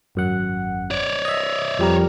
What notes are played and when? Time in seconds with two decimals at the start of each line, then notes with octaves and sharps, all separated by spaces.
0.15 G#1 F#2 F#5
0.91 C#5 D5
1.25 D#5 E5
1.79 F2 G3 A#4